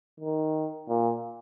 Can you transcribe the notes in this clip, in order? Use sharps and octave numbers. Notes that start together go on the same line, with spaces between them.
D#3
A#2